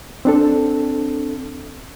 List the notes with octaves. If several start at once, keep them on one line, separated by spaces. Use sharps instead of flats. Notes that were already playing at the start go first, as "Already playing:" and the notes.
C4 D4 A4